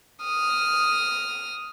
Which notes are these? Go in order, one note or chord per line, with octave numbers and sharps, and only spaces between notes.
D#6 F6